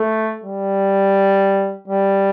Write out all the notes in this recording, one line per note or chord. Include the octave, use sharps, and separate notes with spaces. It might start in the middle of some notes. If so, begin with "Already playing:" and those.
Already playing: A3
G3
G3